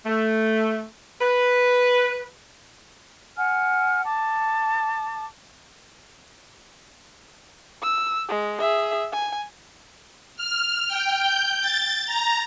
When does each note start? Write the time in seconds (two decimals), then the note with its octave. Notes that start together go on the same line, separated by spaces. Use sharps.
0.06 A3
1.22 B4
3.36 F#5 G#5 F6
4.05 A5 D6
7.82 E6
8.29 G#3
8.60 G#4 E5
9.12 G#5
10.36 F6
10.88 G5
11.21 G6
11.61 A6
12.06 A#5